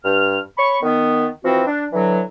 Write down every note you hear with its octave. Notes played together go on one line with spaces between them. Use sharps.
G2 F6
C#5 B5 C#6
D#3 B3
E3 F3 C4 F#4
D4
D3 E3 F#3